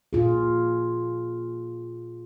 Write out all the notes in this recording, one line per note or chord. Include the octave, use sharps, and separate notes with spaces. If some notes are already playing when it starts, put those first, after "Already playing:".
A#2 F4 G#4